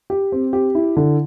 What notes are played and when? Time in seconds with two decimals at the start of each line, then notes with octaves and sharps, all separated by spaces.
0.10 G4
0.32 C4
0.53 G4
0.75 E4
0.96 D3